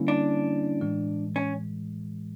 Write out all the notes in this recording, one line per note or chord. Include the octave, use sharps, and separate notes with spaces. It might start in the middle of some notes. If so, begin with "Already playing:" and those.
Already playing: D3 G3 A#3 C#4 E4
D4
A2 E3 G#3
C#4